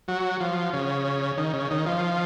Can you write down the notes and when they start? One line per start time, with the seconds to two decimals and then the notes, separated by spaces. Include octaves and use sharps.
0.08 F#3
0.40 F3
0.73 C#3
1.38 D#3
1.53 C#3
1.71 D#3
1.86 F3